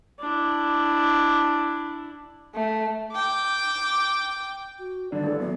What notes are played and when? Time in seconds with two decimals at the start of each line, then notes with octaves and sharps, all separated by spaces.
0.19 D4 E4
2.55 A3
3.13 G5 D6
4.79 F#4
5.12 G2 D3 D5
5.24 A1 A4
5.40 F#2 B3